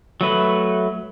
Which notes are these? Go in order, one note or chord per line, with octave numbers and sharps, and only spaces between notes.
F#3 A3 B4